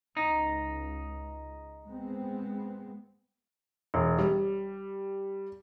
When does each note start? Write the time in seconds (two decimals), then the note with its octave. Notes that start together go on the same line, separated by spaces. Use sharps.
0.17 C#2 D#4
1.86 G#3 B3 C4
3.94 E1
4.19 G3